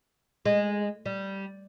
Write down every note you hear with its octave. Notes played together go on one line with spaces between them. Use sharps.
G#3
G3